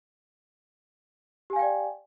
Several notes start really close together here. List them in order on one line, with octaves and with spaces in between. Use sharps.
G4 G#5 F5 G5 D5